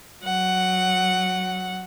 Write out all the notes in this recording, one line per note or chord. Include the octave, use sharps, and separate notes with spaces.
F#3 F#5